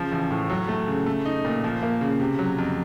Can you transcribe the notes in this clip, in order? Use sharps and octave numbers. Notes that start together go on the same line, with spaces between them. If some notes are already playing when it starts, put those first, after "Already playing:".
Already playing: C#3 F3
A1
A2
F#3
A3
C#3
A3
D#4
A#2
F3
A#3
C#3
C3
F#3
F2